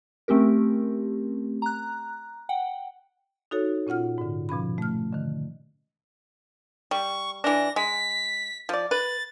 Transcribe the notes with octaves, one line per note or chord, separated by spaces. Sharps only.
A3 C4 C#4 G4 A#4
A#5 F#6
F#5 G5
D#4 F#4 A4 C#5
A#2 C#4 F4 F#5 F6
G#2 D3
B2 F3 C#4 B5
A3 F6
D3 D#3
G3 C#6
E3 D4 A#6
G#3 B6
F3 D5
B4 A6